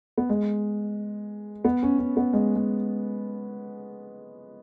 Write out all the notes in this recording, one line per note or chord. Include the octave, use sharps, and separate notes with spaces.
B3
G#3
B3
C#4
C#4
B3
G#3
G#3